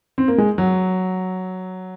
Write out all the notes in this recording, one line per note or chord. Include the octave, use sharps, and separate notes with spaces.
C4
A#3
G#3
F#3